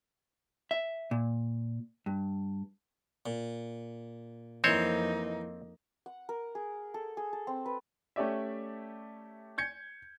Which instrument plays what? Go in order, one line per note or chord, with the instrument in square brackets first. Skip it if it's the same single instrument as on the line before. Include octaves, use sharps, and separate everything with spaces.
[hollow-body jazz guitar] E5
A#2
G2
[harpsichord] A#2
[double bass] F2 A#3 [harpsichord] E3 [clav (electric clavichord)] C4 C5 C#5 [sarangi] D#4
[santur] F#5
A#4
G#4
A4
G#4
A4
C4
B4
[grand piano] A3 C#4 G4 D5 E5
G6 G#6 C#7